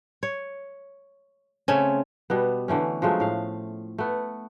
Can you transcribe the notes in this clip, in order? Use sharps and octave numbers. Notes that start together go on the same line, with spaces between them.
C#5
C#3 A3 C4 C#4
B2 G3 B3
D3 E3 A3 C#4
F3 F#3 G#3 A3
A2 F5
A3 B3